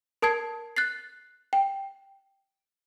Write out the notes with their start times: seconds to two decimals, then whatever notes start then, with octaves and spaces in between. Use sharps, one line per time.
0.22 A#4 A5 D#6 G#6 C7
0.77 F#6 A6 C7
1.53 G5